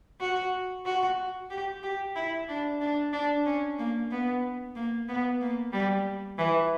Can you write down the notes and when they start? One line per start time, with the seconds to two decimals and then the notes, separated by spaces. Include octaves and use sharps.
0.21 F#4
0.86 F#4
1.50 G4
1.83 G4
2.15 E4
2.48 D4
2.80 D4
3.13 D4
3.46 C#4
3.78 A#3
4.11 B3
4.75 A#3
5.08 B3
5.41 A#3
5.73 G3
6.38 E3